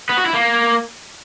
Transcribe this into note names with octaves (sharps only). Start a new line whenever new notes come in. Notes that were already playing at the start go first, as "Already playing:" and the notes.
B3
F#4
E4
A#3